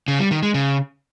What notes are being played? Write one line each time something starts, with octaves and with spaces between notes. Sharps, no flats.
C#3
G3
D#3
G#3
C#3